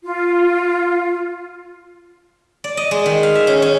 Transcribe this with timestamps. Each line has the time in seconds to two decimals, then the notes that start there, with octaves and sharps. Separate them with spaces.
0.04 F4
2.64 D5
2.77 D#5
2.91 G#3
3.06 D#3
3.23 F5
3.35 E5
3.47 C#4
3.62 C#4